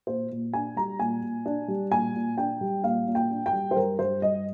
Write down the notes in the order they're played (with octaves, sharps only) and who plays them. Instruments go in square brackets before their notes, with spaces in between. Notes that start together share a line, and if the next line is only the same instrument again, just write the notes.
[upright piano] A#2 C5
A#2
D4 G#5
G3 A#5
A#2 G#5
A#2
D4
G3
A#2 G#5
A#2
D4 G5
G3
A#2 F5
A#2
G5
D4
G5
G3
C5
G2 A#4
G2 C5
G3 D#5